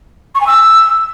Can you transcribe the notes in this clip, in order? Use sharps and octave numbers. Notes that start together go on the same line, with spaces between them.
C#6
G#5
E6